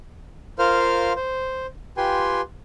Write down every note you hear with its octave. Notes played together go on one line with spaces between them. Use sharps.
F4 A#4 C5 F5 F6
C5
F4 G4 B4 G5 G#5 C6